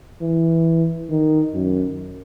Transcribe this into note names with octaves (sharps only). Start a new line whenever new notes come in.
E3
D#3
F#2